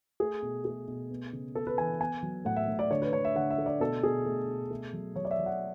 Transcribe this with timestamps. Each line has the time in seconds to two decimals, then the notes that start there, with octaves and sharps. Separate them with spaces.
0.20 A3 G#4
0.42 B2
0.65 A3 G#4
0.88 B2
1.11 B3
1.33 C#3
1.55 B3 A4
1.67 B4
1.78 E3 G#5
2.00 B3 G#5
2.23 F#3
2.45 A2 F#5
2.56 E5
2.68 A2
2.79 D5
2.90 D3 C#5
3.02 B4
3.13 D3 C#5
3.25 E5
3.35 D3 F#5
3.50 E5
3.58 A3
3.66 D5
3.80 B2 A4
4.03 B2 G#4
4.25 A3
4.48 B2
4.71 A3
4.93 F#3
5.16 F#3 C#5
5.25 D5
5.31 E5
5.39 F#3
5.46 F#5